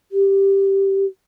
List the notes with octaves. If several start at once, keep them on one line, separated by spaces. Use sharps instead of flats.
G4